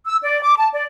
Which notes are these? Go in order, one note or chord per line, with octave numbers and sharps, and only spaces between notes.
E6
D5
D6
A5
D5